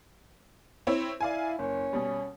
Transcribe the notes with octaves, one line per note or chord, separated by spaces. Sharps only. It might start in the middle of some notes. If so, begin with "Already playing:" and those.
C4 E4 C#5
E4 D5 F5 G#5
F#1 C#4
B2 G3